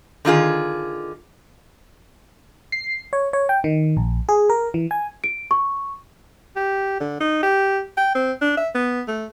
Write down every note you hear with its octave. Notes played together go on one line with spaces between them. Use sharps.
D3 D#3 F4 G#4
C7
C#5
C#5
G5
D#3
A#1
G#4
A#4
E3
G#5
D7
C#6
G4
D3
D#4
G4
G5
C4
D4
E5
B3
A3